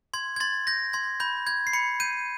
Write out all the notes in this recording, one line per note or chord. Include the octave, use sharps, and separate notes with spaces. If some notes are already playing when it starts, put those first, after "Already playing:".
C6 G#6
G#6
C6 A6
G6 A#6
C6 G#6
B5 G6
G6 G#6
C7
B5 C#7
G6 D#7